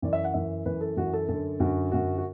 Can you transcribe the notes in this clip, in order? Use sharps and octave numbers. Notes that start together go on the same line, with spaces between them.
F#2 E3 D5
E5
F#5
F#2 E3 E5
F#2 E3 B4
A4
F#2 E3 F#4
A4
F#2 D3 A4
F#2 D3 F#4
F#2 D3 F#4
F#4